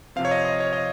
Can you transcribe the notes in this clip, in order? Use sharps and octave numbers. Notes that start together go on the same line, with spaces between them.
C3 F3 C4 F5
C#5
D#5
D#5
C#5
D#5